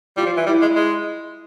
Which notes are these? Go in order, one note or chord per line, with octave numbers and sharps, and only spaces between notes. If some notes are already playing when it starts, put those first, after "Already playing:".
G3 F4
F3
E3
G3 E4
G#3
G#3